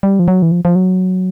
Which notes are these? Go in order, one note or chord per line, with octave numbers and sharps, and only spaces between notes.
G3
F3
F#3
E3
F3
F3
F#3